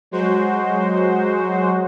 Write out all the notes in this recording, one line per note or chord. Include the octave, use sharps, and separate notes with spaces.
F#3 G#3 F#4 C5